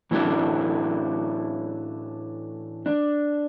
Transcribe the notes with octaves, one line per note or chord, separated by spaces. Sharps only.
A2 E3 A3 D4 F#4
D4